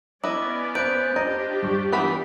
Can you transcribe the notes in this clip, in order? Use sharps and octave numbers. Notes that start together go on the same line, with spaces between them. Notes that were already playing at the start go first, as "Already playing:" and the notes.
B3 C#4 E4 B4 D5 D#5 D6
B4 C5 E5 B5 F#6 G6 D7
D4 F4 G4 D#5 A#5
G2 C#6
E3 B3 B5